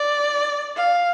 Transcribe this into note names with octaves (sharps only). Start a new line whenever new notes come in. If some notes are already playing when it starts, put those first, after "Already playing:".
Already playing: D5
F5